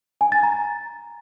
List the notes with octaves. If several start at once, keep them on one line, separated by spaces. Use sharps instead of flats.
G#5
A6
A#5